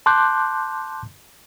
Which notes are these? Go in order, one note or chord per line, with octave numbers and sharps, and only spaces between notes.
A5 C6 D6 F#6 G6